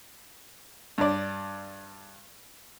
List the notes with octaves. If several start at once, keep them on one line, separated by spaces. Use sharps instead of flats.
G2 D5